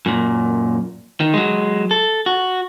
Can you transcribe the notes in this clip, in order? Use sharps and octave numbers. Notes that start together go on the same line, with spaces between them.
F#2 A#2
D#3
F#3 G#3
A4
F#4